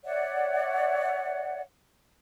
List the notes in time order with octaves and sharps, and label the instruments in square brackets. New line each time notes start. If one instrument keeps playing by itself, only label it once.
[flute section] C#5 D5 E5 F#5